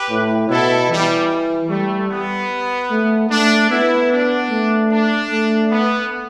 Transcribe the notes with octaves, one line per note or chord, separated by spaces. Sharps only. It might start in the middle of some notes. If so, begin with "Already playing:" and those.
Already playing: G4 B4
A2
B2 E4 A4
E3 G3
G3 A3
B3
A3
A3 D4
B3 E4
D4
A3
D4
A3
B3